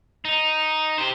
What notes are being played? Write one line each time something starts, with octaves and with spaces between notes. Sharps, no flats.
D#4
G4 C5